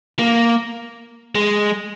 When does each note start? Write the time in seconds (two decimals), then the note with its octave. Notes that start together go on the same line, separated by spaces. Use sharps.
0.19 A#3
1.35 G#3